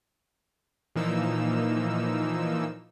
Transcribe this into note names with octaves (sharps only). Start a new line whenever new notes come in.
A#2 E3 F3 A#3 D#4 E6